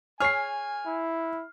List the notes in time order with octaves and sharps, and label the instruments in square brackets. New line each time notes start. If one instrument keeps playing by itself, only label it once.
[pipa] G#4 C#5 [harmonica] G#5 [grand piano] F6 C7
[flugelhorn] E4